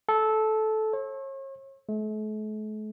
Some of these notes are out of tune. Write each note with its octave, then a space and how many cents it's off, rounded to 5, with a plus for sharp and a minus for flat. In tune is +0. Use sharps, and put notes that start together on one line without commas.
A4 -15
C#5 -40
A3 -45